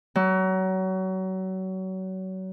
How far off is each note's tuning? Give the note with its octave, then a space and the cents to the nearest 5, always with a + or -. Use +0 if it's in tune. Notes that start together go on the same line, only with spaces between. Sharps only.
F#3 +30